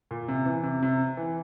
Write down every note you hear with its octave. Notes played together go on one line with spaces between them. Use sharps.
A#2
C3
E3
C3
C3
E3